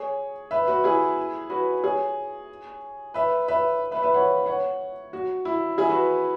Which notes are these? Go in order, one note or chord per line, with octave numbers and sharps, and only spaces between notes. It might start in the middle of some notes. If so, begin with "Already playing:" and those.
Already playing: G#4 C#5
B4 E5
F#4 B4
E4 G#4
F#4 B4
G#4 C#5
B4 E5
B4 E5
B4 E5
B4 E5
C#5 F#5
C#5 F#5
F#4
E4
E4 G#4
F#4 B4